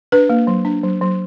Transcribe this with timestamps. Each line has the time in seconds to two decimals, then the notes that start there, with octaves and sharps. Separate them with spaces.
0.12 D4 B4
0.29 A#3
0.47 F#3
0.65 D4
0.83 F#3
1.01 F#3